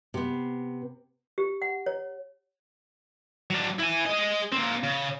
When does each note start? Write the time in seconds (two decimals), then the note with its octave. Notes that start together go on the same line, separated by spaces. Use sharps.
0.14 C3 B3
1.38 G4
1.62 F#5
1.86 C#5
3.50 F#3 D4
3.79 E4 G#5
4.06 G#4 D#5
4.52 A#3 C4
4.83 C#3